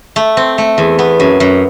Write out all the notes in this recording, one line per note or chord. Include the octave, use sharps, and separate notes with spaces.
A3
C4
A3
E2
B3
F#2
F#2